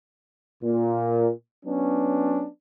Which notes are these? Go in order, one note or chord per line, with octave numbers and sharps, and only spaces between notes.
A#2
F#3 B3 C#4 D4